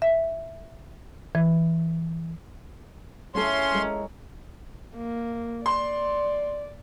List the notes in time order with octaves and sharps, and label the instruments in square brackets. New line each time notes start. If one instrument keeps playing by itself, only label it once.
[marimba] E5
E3
[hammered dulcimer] C#3 E4 [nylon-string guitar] A3 A4 [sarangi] C#4 [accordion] C6
[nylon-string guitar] G#3 [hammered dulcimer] A#4
[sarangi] A#3
[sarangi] D5 [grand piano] C6